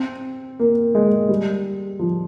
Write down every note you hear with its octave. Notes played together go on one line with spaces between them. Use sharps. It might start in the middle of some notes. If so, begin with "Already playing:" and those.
Already playing: C4
A#3
G#3
G3
F3